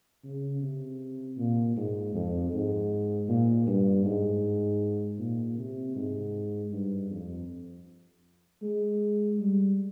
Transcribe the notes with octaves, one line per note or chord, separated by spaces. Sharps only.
C#3
C3
A#2
G#2
F2
G#2
A#2
G2
G#2
A#2
C3
G#2
G2
F2
G#3
G3